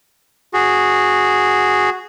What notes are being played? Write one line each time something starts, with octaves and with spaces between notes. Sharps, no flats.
F#4 G#4